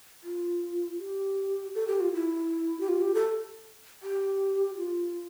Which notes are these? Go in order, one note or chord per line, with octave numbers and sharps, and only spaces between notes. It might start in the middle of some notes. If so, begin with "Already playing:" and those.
F4
G4
A4
G4
F4
E4
G4
F4
G4
A4
G4
F4